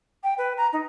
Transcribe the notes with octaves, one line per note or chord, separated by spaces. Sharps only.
G5
B4
A#5
D#4